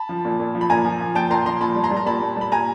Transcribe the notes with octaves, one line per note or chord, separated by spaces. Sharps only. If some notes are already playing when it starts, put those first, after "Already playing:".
Already playing: A5 B5
F3
A#2
A#2
F3
B5
A#2 G#5 A#5
F3
F3
A#2 G5 A5
A#2 A#5 C6
F3 A#5 C6
A#2 A5 B5
G3
A#5 C6
G3
A#5
A#2 A5 B5
A#2
G3 B5
A#2 G#5 A#5